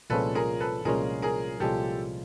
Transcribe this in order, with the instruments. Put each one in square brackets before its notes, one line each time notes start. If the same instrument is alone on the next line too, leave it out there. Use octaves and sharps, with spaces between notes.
[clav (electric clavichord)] C2 A#2 F3 G#3 C#4 [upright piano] A4 B4
[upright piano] G#4 A#4
A4 B4
[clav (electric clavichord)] C2 A#2 F3 G#3 C#4 [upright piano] G#4 A#4
[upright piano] G#4 A#4
[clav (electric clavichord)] C2 A#2 F3 G#3 C#4 [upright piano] G4 A4